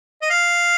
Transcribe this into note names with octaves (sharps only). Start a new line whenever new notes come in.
D#5
F5